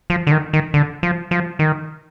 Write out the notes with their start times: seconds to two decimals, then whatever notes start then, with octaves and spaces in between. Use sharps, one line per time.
0.10 F3
0.27 D3
0.31 D#3
0.53 D#3
0.74 D3
1.03 F3
1.31 F3
1.59 D#3